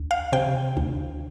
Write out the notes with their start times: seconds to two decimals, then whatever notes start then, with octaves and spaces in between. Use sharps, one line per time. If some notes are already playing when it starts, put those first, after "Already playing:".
Already playing: D2
0.11 F5
0.32 C3 G5
0.77 D2